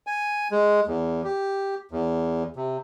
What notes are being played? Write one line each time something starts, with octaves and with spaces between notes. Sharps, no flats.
G#5
G#3
E2
G4
E2
C3